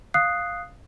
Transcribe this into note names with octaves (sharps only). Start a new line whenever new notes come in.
F5 D#6 F#6 C7